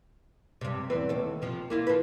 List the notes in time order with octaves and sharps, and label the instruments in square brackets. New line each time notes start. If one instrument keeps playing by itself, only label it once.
[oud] G2 C3
E2 C4 B4
D#2 A4
C3 F3
A#3 E4 F4
F3 B4